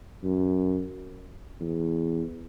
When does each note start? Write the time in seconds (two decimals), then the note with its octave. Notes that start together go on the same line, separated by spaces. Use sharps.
0.24 F#2
1.61 E2